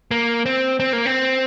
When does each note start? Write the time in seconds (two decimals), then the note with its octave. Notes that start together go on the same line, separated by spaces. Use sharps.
0.11 A#3
0.46 C4
0.80 C4
0.93 A#3
1.06 C4